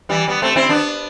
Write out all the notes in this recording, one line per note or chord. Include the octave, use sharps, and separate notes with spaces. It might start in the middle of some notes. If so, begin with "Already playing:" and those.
E3 G3
G3 B3
A3 C4
C4 E4
B3 D4